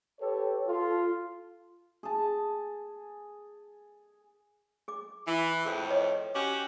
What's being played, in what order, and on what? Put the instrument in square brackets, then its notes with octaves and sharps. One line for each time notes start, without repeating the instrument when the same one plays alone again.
[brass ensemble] G4 A4 B4 C#5
F4 A4
[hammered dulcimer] G#4 A5
[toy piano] G#4 D6
[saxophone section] E3
[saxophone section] F2 A2 [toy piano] G#4 A4
[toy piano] B4 C#5 D#5
[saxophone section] C#4 F#4 G4